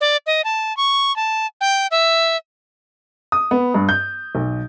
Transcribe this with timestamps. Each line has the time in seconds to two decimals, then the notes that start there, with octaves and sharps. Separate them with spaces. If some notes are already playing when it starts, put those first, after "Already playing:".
0.01 D5
0.27 D#5
0.44 A5
0.77 C#6
1.16 A5
1.61 G5
1.91 E5
3.32 D#6
3.51 B3
3.74 G2
3.89 G6
4.35 B1